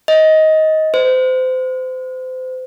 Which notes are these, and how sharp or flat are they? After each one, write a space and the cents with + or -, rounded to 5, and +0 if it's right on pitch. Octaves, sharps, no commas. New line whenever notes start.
D#5 +15
C5 -30